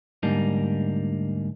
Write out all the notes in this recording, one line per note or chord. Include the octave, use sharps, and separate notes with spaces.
D2 G#2 G3 A#3 D4 D#4